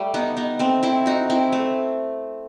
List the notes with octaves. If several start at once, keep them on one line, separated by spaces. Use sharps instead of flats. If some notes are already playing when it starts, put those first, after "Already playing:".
Already playing: G3 A3
B3 D#4
B3 D#4
A3 C4
C4 E4
D#4 F#4
C4 E4
A3